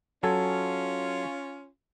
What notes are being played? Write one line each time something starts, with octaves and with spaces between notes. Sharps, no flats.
F#3 C#4 F4 A4 G#5